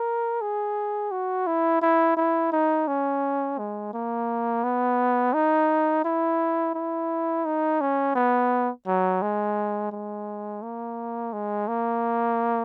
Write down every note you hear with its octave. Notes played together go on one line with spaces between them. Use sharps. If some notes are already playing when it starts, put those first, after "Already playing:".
Already playing: A#4
G#4
F#4
E4
E4
E4
D#4
C#4
G#3
A#3
B3
D#4
E4
E4
D#4
C#4
B3
F#3
G#3
G#3
A#3
G#3
A#3